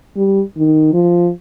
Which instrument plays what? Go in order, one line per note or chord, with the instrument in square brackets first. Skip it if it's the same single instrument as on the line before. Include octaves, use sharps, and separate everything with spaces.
[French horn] G3
D#3
F3